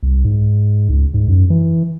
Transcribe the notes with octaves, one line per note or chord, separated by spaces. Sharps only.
C2
G#2
C#2
G#2
F#2
E3